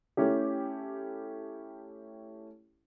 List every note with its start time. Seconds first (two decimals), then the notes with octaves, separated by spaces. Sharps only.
0.17 A3 C#4 E4 G4